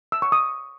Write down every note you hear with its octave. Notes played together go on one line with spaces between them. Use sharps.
E6
C#6
D#6